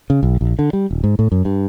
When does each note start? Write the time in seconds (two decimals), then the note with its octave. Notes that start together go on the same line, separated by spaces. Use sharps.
0.10 C#3
0.23 B1
0.41 A#1
0.59 D3
0.73 G3
0.91 D#1
1.04 G#2
1.19 A2
1.32 F#2
1.45 G2